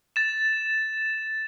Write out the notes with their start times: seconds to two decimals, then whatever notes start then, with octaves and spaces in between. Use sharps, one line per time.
0.16 A6 E7